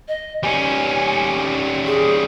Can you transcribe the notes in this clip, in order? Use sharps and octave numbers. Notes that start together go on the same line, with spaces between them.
D#5
G3 C#4 G#5
G#4